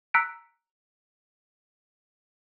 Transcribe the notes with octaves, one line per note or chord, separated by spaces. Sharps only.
A#5 E6 F#6 B6 C#7 D7